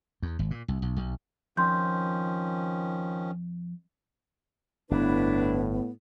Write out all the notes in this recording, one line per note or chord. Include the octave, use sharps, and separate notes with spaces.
E2
G#1
A#2
C2
B1
B1
F2 D#3 F3 C#4 C6 G6
G1 A2 B3 D4 E4 B4